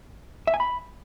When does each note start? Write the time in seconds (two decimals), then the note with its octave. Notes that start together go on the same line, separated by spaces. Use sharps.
0.47 E5
0.54 G#5
0.60 B5